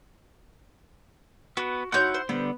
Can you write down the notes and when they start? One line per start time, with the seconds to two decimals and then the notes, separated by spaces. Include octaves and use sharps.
1.57 B3 F#4 B4
1.92 D#4 E4 F#4 C#5 F#5 C6 G6
2.14 C5
2.29 D3 G3 B3